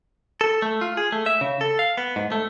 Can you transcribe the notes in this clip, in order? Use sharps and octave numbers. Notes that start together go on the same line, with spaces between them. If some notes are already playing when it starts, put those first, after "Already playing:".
A4
A3
F4
G#4
A3
E5
C#3
A4
F5
B3
G#2
A3